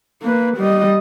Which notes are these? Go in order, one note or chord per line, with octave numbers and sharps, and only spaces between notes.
A#3 B4
G3 D#5